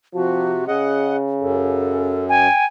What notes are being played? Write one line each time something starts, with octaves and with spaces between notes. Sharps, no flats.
C3 F3 F#4
C#3 G#4 D#5 F#5
F#2 A4
G5 G#5